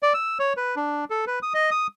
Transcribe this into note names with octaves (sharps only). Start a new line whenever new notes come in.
D5
E6
C#5
B4
D4
A4
B4
D#6
D#5
D#6